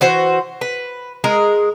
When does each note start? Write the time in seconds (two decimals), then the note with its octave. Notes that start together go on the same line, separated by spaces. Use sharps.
0.01 E3 F#4 C5
0.61 B4
1.24 G#3 A#4